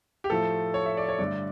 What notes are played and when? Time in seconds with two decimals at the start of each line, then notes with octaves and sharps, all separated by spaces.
0.24 G4
0.30 A2 F3 A3 A4
0.74 C#5
0.86 E5
0.97 D5
1.09 C#5
1.19 G2 D3 A3 D5